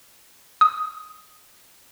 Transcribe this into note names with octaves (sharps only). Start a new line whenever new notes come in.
D#6